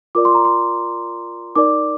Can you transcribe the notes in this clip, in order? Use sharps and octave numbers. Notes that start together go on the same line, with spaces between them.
F4 A#4 D5 D6
C6
A#5
C6
D#4 A#4 D5 D6